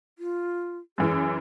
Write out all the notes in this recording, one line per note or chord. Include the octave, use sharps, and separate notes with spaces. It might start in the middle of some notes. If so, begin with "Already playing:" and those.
F4
F#2 E3 G#4